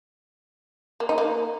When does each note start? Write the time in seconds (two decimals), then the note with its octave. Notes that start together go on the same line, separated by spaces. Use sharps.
1.00 A#3
1.09 D#4
1.18 A#3